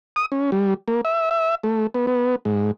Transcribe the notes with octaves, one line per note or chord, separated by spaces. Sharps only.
D#6
C#4
G3
A#3
E5
E5
A3
B3
B3
G#2